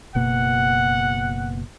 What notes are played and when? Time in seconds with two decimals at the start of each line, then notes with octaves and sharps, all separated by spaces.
0.15 F#1 B2 A#3 F#5